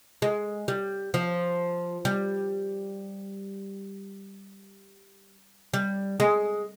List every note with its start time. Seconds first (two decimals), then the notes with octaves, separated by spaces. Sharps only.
0.22 G#3
0.68 G3
1.14 F3
2.05 G3
5.73 G3
6.20 G#3